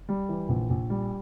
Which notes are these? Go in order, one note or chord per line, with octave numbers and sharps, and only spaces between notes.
G3
E3
A#1
A#1
G3